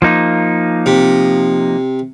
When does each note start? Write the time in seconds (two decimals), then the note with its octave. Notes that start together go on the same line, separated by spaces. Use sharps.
0.02 F3 A#3 D#4
0.86 C3